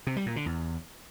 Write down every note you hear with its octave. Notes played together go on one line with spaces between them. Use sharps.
C3
G3
A#2
D3
E2